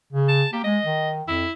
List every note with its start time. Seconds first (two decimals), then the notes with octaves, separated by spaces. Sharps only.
0.13 C#3
0.29 A5
0.53 A#3 G4
0.64 G#3 D#5
0.85 D#3
1.28 F2 E4